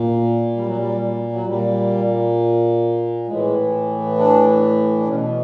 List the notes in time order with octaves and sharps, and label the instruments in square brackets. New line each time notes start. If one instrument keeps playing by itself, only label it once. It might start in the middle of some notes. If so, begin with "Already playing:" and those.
Already playing: [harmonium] A#2
G3
F#3
G3
F#3
A#2 G3
A2 E3 G#3
D4
D4
B2 C#4